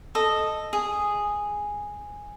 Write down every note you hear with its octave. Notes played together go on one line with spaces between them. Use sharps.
A4 D#5
G#4